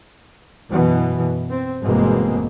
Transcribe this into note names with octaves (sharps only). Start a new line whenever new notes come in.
F#2 B2 E3
C4
G1 E2 B2 G#3 A#3 C4